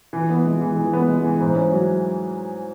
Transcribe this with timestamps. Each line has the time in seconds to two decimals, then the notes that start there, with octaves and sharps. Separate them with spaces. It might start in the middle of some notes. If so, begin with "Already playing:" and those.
0.13 E3
0.30 B3
0.46 G#3
0.61 E3
0.77 E3
0.93 B3
1.09 G#3
1.24 E3
1.41 G#2
1.56 C#4
1.72 F#3